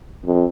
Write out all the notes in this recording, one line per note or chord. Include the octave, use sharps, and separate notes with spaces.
F2